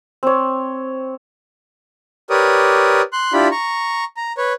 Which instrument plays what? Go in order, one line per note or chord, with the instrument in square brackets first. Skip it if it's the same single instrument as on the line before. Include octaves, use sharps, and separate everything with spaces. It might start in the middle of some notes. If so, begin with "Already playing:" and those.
[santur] C4 C#5
[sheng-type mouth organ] G4 A#4 B4 C#5 D5 D#6
C6 F#6
D4 E4 F4 G4 D5 B5
A#5 C#6
A#5
B4 C#5